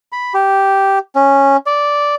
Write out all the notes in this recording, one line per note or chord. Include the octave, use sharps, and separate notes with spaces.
B5
G4
C#4
D5